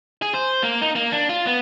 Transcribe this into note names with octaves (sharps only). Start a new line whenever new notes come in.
G#4
C5
A#3
D#4
A#3
D4
F4
B3